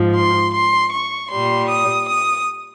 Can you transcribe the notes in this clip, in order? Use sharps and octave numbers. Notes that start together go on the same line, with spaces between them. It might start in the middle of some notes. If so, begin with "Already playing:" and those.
Already playing: G#2 F3
C6
C6
C#6
A#2 G3 C6
D#6
D#6